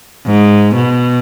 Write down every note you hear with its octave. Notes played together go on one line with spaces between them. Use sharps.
G#2
B2